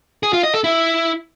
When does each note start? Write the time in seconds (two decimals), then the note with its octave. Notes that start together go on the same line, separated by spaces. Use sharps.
0.23 G#4
0.33 F4
0.43 D#5
0.54 A4
0.64 E4